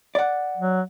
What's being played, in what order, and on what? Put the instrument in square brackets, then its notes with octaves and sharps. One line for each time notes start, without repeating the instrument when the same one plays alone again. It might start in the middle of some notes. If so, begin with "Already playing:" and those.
[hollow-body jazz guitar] D5 F#5
[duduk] F#3